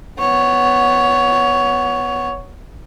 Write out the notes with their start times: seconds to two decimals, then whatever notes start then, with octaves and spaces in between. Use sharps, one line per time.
0.19 B3 C#5